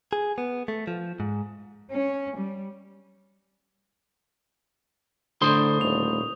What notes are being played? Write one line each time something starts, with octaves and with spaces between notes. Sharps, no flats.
G#4
B3
A3
F3
G#2
C#4
G3
A2 D3 C5 C6 D#6
D#1 F7